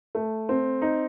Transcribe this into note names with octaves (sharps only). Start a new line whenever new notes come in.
A3
C4
D#4